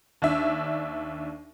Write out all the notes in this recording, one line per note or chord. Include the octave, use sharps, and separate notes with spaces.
D#2 D4 E5